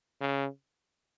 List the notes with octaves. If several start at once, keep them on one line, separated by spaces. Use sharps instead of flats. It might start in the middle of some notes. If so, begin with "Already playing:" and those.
C#3